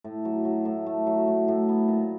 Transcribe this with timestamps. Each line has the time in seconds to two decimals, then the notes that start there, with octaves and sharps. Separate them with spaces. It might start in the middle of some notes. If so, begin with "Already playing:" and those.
0.04 A2
0.25 F#3
0.45 F#3
0.65 A2
0.86 A3
1.07 F#3
1.28 A2
1.48 A2
1.69 B3
1.88 A#2